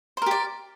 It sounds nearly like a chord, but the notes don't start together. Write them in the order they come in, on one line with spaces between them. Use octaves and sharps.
C5 A#4 G4 D5